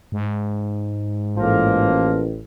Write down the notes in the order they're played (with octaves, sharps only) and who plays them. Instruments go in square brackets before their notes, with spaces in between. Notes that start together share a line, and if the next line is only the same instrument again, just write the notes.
[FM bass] G#2
[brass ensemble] A1 [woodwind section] F3 A#3 A#4